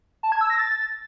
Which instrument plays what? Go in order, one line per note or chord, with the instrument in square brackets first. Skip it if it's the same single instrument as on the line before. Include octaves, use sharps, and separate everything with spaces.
[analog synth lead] A5
G#6
E6
A#6
A6